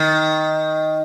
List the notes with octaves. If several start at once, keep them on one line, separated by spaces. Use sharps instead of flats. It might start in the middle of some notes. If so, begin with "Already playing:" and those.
Already playing: D#3